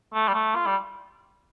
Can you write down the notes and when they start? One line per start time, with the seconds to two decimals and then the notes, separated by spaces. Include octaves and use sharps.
0.14 A3
0.28 G3
0.34 A3
0.55 F4
0.66 G3